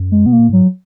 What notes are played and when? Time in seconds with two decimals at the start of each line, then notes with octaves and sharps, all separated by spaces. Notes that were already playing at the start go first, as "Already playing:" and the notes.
Already playing: F#2
0.11 G#3
0.26 B2 B3
0.32 A#3
0.38 A#2
0.50 G#2 F#3